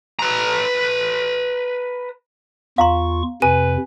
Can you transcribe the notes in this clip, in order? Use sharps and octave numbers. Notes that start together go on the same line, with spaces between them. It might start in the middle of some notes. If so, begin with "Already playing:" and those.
B4 A#5
E2 F4 F5 A#5 C6 C#6
F2 C3 B4 G#5